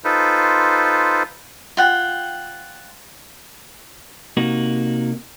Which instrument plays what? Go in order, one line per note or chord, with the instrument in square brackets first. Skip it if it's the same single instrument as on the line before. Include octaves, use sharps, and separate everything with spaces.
[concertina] D#4 F4 A4 B4 C5
[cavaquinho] F4 F#5 G5
[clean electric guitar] C3 A#3 D#4 F#4